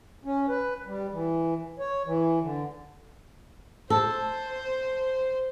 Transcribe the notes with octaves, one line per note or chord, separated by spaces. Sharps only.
C#4
B4
G3
E3
C#5
E3
D3
A4 C5